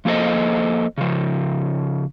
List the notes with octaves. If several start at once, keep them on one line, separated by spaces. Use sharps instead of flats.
F3 A#3 A4 C5 D#5
C#3 F3